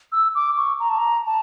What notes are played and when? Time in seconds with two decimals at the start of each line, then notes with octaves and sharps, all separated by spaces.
0.12 E6
0.35 D6
0.57 C#6
0.80 A#5
0.89 A5
0.98 A#5
1.26 A5